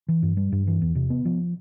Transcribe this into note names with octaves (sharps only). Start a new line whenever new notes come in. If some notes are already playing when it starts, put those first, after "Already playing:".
E3
G2
G3
G2
E3
E2
C3
B3
F3